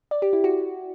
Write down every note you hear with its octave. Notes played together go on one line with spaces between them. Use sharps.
D5
G4
E4
F#4